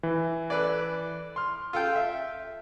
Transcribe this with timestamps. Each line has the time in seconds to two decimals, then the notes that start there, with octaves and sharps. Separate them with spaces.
0.03 E3
0.50 A4 B4 D5
1.36 C6 F6
1.73 F4 A4 G5
1.95 E5